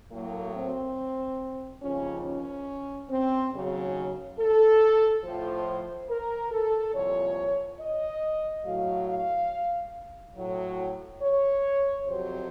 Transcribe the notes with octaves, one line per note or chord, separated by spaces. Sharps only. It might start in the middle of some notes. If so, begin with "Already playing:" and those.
A2 F#3 A#3
C4
D#2 C#3 F3 C#4
C#4
C4
D#2 C#3 F#3
A4
A2 F3 C5
A#4
A4
C2 A#2 F3 C#5
D#5
A2 F#3 F5
F5
A2 F#3
C#5
F2 C3 F#3 C5